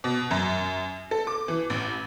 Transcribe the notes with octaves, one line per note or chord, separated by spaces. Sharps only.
B2
F#2
A4
D6
E3
A1